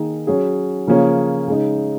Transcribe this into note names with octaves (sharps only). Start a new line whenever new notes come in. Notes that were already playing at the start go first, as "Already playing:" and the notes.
Already playing: D#3 A#3 D#4 G#4
F#3 C#4 G#4
C#3 F3 A#3 C#4 G#4
C#3 G#3 D#4